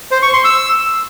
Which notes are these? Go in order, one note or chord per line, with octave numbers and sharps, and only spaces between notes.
C5
C#6
C6
E6